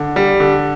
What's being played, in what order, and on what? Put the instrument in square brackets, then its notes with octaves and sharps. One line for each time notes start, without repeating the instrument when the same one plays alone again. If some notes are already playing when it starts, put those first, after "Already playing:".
Already playing: [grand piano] D3
G3
D3